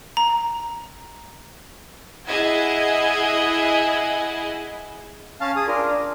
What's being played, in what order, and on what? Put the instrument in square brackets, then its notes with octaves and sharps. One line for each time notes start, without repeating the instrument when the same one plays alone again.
[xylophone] A#5
[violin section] E4 G#4 D#5 F#5 G#6
[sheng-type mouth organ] C#4 F5 A5
G#4 D#6
D4 F4 A#4
D4